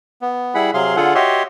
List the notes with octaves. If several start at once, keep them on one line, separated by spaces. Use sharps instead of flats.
B3
G3 E4 G#4 F#5 B5
C3 F#3 G#4 F5 C6
D3 F4 G#4 A4 F#5
F#4 G4 C#5 D#5 E5 C6